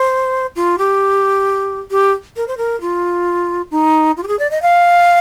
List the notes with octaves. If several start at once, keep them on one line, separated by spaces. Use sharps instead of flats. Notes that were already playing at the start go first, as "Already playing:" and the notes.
Already playing: C5
F4
G4
G4
A#4
C5
A#4
F4
D#4
F4
G4
G#4
D5
D#5
F5